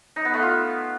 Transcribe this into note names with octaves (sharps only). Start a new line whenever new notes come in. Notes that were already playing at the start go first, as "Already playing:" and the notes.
D#4
B3
A3
F4